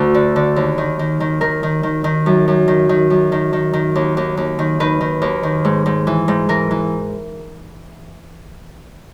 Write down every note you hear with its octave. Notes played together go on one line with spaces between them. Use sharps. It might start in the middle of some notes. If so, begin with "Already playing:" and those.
Already playing: D2
D3
D3
D#2
D#3
D#3
D#3
D#3 A#4
D#3
D#3
D#3
F#2
F#2
D#3
D#3
F#2
D#3
D#3
D#3
D#2
D#2
D#2
D#3
D#3 B4
D#3
D#2
D#3
G#2
G#2
E3
G#2
E3 A#4
E3